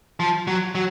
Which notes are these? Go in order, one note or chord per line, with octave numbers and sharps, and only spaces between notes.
F3
F#3
F#3